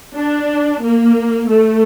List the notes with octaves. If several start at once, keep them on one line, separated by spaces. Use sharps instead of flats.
D4
A#3
A3